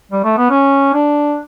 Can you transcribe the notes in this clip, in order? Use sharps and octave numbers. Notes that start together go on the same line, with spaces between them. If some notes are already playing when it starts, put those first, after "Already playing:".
G3
A3
B3
C#4
D4